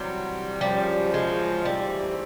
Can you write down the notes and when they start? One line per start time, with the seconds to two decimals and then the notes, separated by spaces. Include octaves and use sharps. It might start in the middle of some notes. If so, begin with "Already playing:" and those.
Already playing: C3 E3 F#3 G3
0.61 F#2 C#3 F3 G3
1.14 G#3
1.65 G#2 E3 G3 A3 C4